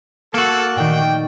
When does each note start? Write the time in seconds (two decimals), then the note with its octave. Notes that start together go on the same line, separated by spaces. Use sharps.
0.34 A#3 F#4 A4
0.76 A#2 D#3 A3 D5 G5